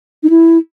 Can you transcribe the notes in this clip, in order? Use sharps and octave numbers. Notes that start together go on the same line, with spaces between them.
D#4
E4